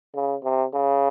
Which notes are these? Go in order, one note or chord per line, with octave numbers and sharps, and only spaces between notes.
C#3
C3
C#3